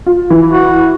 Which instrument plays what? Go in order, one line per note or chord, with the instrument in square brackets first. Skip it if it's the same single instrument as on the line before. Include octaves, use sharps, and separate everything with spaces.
[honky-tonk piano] F4
E3
[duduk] F#4